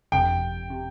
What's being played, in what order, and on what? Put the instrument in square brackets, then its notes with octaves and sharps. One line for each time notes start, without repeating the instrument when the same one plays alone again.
[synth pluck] G1 F2 C3 [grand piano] G5
[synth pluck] C3